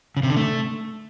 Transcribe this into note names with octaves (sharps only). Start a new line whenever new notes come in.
C#3
C3
D3
A3